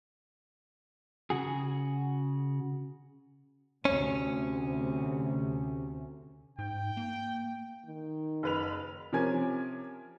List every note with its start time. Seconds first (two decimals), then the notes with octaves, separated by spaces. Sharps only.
1.30 C#3 F#4 G#4
3.85 D2 C3 C#4
6.59 G#2 G5
6.97 A#3
7.85 D#3
8.43 F#1 B4 F7
9.12 C3 F3 C#4 A#4 G#5 G#6